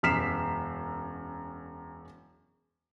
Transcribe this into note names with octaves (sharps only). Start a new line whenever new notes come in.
E1 F#2 F6 B6 C7 E7